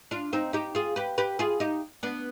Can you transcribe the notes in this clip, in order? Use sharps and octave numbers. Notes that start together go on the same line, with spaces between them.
D4 F4
C4 D#4
D#4 G4
F4 G#4
G4 B4
G4 B4
F4 G#4
D#4 G4
B3 D4